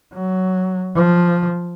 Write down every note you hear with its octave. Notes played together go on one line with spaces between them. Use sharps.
F#3
F3